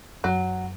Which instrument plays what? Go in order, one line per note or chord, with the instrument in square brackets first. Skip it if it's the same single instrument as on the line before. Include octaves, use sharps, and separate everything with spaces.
[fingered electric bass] F#2 [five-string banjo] F#3